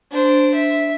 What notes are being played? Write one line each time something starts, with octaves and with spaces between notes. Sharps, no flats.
D4 C5
E5